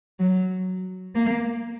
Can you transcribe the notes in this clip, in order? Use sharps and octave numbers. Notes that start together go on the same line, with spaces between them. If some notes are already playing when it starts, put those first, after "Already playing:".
F#3
A#3